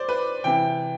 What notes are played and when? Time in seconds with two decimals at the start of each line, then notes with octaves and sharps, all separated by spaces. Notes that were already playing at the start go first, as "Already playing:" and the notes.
Already playing: C5 D5
0.09 B4
0.44 C3 E3 G5